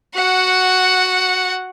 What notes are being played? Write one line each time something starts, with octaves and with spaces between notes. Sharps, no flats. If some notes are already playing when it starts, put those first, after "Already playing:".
F#4 F#5